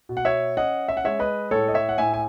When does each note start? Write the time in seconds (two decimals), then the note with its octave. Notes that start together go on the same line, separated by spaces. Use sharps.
0.09 B2
0.17 F#5
0.25 C#5 E5
0.57 C#4 D#5 F#5
0.89 E5
0.97 F#5
1.04 G#3 C#5 E5
1.19 B4 D#5
1.51 A2 A4 C#5
1.68 D#5
1.74 C#5 E5
1.89 F#5
1.98 A2 E5 G#5
2.13 G#5